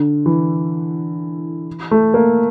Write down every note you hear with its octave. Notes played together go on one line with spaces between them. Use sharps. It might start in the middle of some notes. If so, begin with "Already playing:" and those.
Already playing: D3
E3
A3
A#3